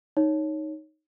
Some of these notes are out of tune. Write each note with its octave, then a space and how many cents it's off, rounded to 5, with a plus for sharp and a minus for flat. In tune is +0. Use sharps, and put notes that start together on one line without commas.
D#4 +0 C#5 +0